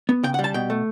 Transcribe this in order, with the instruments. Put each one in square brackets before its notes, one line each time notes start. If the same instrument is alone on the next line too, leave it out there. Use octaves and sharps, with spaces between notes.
[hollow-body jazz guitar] B3
C#3 G5
F#5
G3
A5
B2 G5
A3